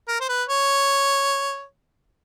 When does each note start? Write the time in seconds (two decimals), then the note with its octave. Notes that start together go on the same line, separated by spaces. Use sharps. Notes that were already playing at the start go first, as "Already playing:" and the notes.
0.08 A#4
0.21 C5
0.29 B4
0.49 C#5